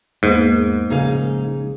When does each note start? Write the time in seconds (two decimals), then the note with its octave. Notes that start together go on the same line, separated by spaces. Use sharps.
0.23 E2 G#2 A#3 B3
0.90 A#1 C#3 A#3 D#4 G#4 F5